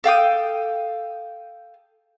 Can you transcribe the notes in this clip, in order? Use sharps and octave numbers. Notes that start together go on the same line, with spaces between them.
A4 F5 G5 D#6